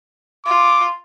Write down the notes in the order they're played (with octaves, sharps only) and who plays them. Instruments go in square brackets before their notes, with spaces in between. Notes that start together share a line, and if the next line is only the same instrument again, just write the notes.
[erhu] F4 [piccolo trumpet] D6